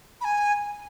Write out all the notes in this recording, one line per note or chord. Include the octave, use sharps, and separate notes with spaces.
B5
G#5